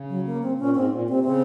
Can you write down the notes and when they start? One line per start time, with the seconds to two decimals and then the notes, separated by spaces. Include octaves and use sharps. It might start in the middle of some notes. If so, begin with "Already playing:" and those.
Already playing: C#3
0.09 F#3
0.26 A#3
0.42 C4
0.58 A#2 C#4
0.75 G#2 C4
0.92 A#2
1.08 C3 C4
1.24 C#3 C4